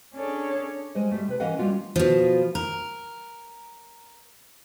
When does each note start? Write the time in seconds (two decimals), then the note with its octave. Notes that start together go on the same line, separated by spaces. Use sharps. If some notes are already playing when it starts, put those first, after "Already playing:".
0.14 C#4 D4 G#4 A4 C#5
0.95 G3 G#3 C5 D#5
1.11 G3 A3
1.28 C3 B4
1.40 E3 C#4 A#4 D#5 F5 F#5
1.58 G3 A#3 C#4 F4 F#4
1.96 B2 F3
2.55 A#4